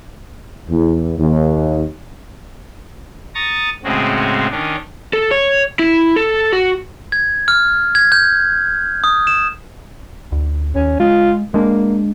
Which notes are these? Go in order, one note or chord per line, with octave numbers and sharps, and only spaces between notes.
E2
D#2
A#5 C#6 D#6 A6 A#6
A2 C#3 G#3 C4 C#4 F#4
D#3 C#4 D4
A4
C#5
E4
A4
F#4
G#6
F6
G#6
G6
D#6
E7
D2
D#2 C#4
G#3 F4
G#3 A#3 D4